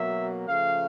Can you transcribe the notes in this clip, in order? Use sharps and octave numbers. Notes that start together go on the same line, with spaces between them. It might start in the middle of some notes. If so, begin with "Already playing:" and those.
Already playing: B2 F#3 A#3 E5
C#3 F3 A3 F5